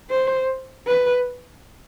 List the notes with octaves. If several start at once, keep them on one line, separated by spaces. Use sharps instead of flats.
C5
B4